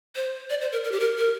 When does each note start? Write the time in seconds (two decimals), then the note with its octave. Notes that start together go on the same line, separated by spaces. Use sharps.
0.16 C5
0.50 D5
0.61 C5
0.72 A#4
0.84 A#4
0.92 G4
1.00 A#4
1.18 A#4